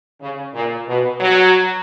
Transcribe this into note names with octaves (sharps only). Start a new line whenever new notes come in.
C#3
A#2
B2
F#3